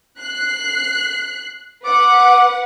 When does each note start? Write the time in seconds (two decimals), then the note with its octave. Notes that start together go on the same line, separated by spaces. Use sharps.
0.18 F#6 C7
1.85 B4 F#5 D6